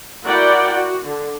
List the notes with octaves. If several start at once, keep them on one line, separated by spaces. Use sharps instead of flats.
E4 F#4 A#4 D5 F#5 G5
F#4
D3